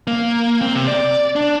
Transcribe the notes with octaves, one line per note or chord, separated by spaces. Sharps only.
A#3
C4
C3
D5
D4